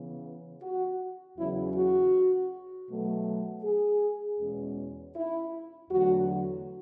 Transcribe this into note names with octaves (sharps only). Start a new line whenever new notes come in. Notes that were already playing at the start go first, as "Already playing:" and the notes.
Already playing: C#3 E3 B3
F#4
E2 C#3 F#3 C#4 E4
F#4
B2 F#3 A3
G#4
E2 B2 G#3 C#4
E4
E2 D3 F#3 A3 F#4